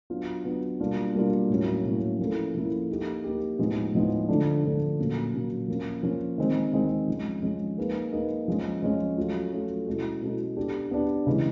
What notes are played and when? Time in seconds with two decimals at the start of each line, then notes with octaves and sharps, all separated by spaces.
0.10 F#3 B3 D4 F4
0.45 F#3 B3 D4 F4
0.80 B2 G3 A#3 D4 F4
1.14 B2 G3 A#3 D4 F4
1.50 A2 F#3 A#3 C#4
1.85 A2 F#3 A#3 C#4
2.19 F3 A#3 C#4 E4 A4
2.55 F3 A#3 C#4 E4 A4
2.90 A#3 D#4 G4
3.24 A#3 D#4 G4
3.59 A2 F3 G#3 B3 D#4
3.94 A2 F3 G#3 B3 D#4
4.28 D3 F3 A3 D4
4.64 D3 F3 A3 D4
4.98 A#2 F#3 A#3 C#4
5.34 A#2 F#3 A#3 C#4
5.68 F3 A#3 C#4
6.03 F3 A#3 C#4
6.38 D#3 G#3 C4
6.73 D#3 G#3 C4
7.08 F3 G#3 C#4
7.43 F3 G#3 C#4
7.78 A#3 D#4 G#4 B4
8.12 A#3 D#4 G#4 B4
8.48 F3 G#3 C#4
8.82 F3 G#3 C#4
9.17 F#3 A3 C#4 F4
9.52 F#3 A3 C#4 F4
9.87 B2 G#3 C#4 E4 A4
10.21 B2 G#3 C#4 E4 A4
10.57 B3 D4 G4
10.91 B3 D4 G4
11.27 C#3 E3 G#3